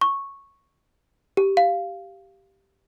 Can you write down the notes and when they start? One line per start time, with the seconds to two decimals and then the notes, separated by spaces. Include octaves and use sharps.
0.01 C#6
1.37 G4
1.57 F5